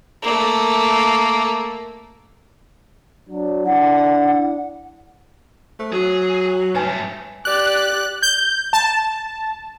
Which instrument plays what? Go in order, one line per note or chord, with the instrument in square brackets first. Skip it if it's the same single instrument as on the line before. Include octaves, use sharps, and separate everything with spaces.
[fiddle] A3 A#3
[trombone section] F#3 D4
[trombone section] D4 E4 [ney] F#5
[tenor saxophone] A3 [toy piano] C5
[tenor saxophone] F#3 [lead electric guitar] G#4
[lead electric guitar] G2 A3 [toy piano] B4 C#5 G#5
[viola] G4 D5 [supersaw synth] F#6
[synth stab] G6
A5